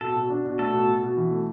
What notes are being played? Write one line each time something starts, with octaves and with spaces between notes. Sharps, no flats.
B2 A4
B2
D4
B2
A3 A4
B2
B2
B2
E3
A3